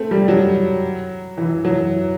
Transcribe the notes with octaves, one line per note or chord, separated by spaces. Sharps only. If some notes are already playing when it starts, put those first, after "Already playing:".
Already playing: A3 C4
G3
F#3
E3
F#3